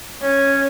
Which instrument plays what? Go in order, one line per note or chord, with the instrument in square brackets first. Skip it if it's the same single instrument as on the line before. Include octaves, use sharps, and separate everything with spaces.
[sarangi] C#4